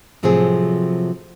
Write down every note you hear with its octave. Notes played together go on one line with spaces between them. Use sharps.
A2 C3 F3 F#3 C4 G#4